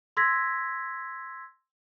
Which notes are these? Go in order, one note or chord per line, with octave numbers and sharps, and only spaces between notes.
C6 E6 G#6 A#6 B6